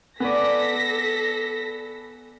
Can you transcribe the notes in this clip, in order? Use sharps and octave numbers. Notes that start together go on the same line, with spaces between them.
B3 A4 D5 G#5 A#6 B6